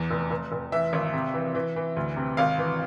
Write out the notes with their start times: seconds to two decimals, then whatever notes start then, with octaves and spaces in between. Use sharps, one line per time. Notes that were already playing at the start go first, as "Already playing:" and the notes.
Already playing: E2 E3
0.11 F1
0.31 F1
0.52 F1
0.72 E3 E5
0.93 G#1
1.13 C3
1.34 E3
1.55 E3
1.76 E3
1.97 D2
2.17 C3
2.37 G#1 F5
2.58 E3